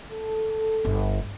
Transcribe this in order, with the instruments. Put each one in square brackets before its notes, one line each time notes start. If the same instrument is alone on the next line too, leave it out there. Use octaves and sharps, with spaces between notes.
[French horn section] A4
[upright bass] G1